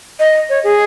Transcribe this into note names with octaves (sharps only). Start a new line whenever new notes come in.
D#5
C#5
G#4